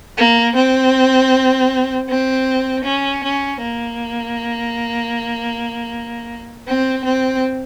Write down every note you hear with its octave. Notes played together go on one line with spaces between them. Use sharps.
A#3
C4
C4
C#4
C#4
A#3
C4
C4